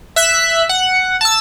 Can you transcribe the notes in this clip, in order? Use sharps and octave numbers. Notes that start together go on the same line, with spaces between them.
E5 F#6 B6
F#5
A5 E6